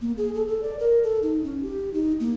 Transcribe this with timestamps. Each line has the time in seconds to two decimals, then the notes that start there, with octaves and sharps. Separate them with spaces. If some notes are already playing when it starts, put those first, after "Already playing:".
0.02 A#3
0.17 G#4
0.35 A4
0.48 A4
0.63 D5
0.79 A#4
1.03 A4
1.23 D#4
1.44 C#4
1.63 G4
1.94 D#4
2.20 A#3